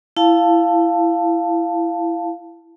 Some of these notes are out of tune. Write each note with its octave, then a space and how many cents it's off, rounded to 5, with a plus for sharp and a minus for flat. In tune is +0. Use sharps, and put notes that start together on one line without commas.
E4 +15 F5 +0 A5 +5